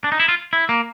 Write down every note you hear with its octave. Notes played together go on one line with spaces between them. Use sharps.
D4
D#4
E4
F4
E4
A#3